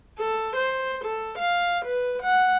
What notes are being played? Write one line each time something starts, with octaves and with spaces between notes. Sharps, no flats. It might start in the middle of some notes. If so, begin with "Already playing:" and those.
A4
C5
A4
F5
B4
F#5